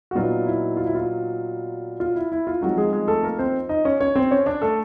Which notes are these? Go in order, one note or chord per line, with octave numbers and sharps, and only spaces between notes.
F#4
A#2 F#3 B3 D#4 F4
E4
F4
E4
F4
F4
E4
E4
F4
F3 F#3 G#3 C4 D#4 F#4
G#3 G#4
G#3 G#4
A3 A4
A#3 A#4
C4 C5
D#4 D#5
C#4 C#5
C#4 C#5
C4 C5
C#4 C#5
D4 D5
A3 A4